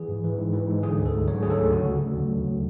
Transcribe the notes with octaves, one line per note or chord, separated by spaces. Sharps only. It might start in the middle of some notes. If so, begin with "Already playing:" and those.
Already playing: E3 G#4
G#2
E3
G#2
E3
G#2
D3 G#4
D2
A4
D2
F#3 C#5
D3 G#4
A4
D2
C#3 F#4
D2
D2
F#3